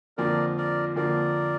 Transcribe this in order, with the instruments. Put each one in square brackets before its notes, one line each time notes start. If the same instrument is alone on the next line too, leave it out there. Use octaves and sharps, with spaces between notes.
[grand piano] F2 D3 F3 A#3 [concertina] A#4 D5
[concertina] A#4 D5
[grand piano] F2 D3 F3 A#3 [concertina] A#4 D5